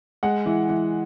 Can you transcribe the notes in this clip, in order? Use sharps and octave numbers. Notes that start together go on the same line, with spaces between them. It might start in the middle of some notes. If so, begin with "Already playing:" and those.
G#3 F#5
E3
E3